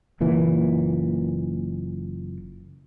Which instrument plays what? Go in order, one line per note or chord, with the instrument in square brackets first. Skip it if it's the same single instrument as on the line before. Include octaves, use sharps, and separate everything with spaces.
[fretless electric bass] F#1 A#2 E3